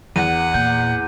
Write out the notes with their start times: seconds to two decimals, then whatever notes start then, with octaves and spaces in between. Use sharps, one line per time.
0.16 E2 F#5 D#7
0.54 A#2 G6